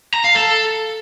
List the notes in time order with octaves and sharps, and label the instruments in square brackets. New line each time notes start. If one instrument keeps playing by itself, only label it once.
[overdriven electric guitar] A#5
F5
A4